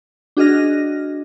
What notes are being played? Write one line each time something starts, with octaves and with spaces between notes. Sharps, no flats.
D4 F#4 G#4 D#5 F6 A#6